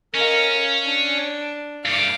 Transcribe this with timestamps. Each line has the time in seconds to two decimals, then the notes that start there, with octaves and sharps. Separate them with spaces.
0.15 C#4 A#4 D#5 F5
0.86 D4
1.85 G2 A3 F5 D6